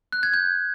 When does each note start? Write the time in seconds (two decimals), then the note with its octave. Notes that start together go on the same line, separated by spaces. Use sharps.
0.12 F#6
0.23 G#6
0.34 G6